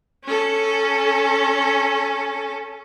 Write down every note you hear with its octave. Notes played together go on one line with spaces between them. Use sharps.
C#4 A4